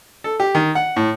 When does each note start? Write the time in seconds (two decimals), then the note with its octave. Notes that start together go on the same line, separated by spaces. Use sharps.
0.24 A4
0.40 G4
0.55 D#3
0.75 F#5
0.96 A2